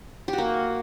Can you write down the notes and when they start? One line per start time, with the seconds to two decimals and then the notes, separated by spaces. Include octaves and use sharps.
0.28 G4
0.33 F#4
0.38 A#3